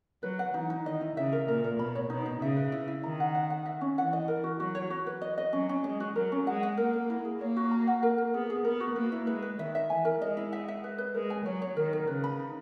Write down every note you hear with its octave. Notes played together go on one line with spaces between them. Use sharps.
F#3 B4
F#5
E3 D#4
D#4
D#3 D#5
E4
C#3 E5
A#4
A#2 A#4
A#4
B2 B5
C#5
B2 D#4
D#4
C#3 E5
B4
E4
E4
D#3 A#5
F#5
F#5
F#5
E5
C#4
E3 F#5
D#5
A#4
F#4
F#3 F#4
C#5
F#4
B4
D#5
D#5
F#3 C#4
C#4
G#3 D#5
F#4
F#3 A#4
C#4
G#3 F#5
F#5
A#3 A#4
A#4
E4
G#4
A#3 C#5
F#4
A#5
F#5
A#4
A#4
B3 G#4
G#4
B3 A#4
F#4
A#3 B4
E4
G#3 B4
B4
D#3 E5
E5
E3 G#5
A#4
G#3 D#5
E4
E5
E5
B4
B4
G#3 A#4
G#5
F#3 C#5
C#5
D#3 A#4
A#4
C#3 B4
B5
D#4